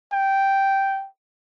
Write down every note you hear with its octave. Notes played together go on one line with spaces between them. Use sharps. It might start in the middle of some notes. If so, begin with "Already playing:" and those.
G5